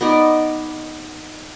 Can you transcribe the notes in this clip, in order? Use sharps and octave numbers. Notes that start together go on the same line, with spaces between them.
B3 D#4 D5